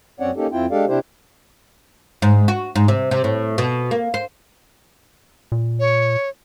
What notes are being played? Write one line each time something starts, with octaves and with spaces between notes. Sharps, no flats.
F#2 C4 C#4 C#5 D5 F#5
A#3 C#4 D#4 G4 A4
F2 C4 E4 F4 G5
G#3 D4 G4 A4 D5 F5
C3 D4 E4 G4 C5
G#2
F#4
G#2
C3
C3
A2
B2
A#3
C5
A#2
C#5